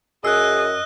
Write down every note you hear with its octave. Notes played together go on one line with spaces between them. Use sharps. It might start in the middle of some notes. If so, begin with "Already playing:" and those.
F#2 G#4 D#5 E6 F#6